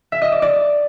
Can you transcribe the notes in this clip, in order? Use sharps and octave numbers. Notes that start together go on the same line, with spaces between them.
E5
D#5
D5
D5